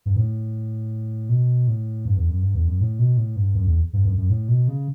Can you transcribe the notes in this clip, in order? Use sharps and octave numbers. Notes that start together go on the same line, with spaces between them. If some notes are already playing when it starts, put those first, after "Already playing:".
G2
A2
B2
A2
G2
E2
F#2
G2
E2
F#2
A2
B2
A2
G2
F#2
E2
G2
F#2
F#2
A2
B2
C#3